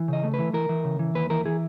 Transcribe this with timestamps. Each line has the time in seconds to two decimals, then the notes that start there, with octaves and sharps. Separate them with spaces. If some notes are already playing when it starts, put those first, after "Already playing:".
Already playing: E3
0.08 C#3 D#5
0.23 A3
0.34 B4
0.39 E3
0.53 E3 A#4
0.69 E3
0.85 C#3
0.99 E3
1.15 D#2 B4
1.30 E3 A#4
1.45 E3 G#4